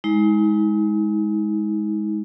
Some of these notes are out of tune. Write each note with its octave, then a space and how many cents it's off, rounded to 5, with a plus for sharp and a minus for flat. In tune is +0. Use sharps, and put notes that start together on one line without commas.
G#3 +0 D#4 +45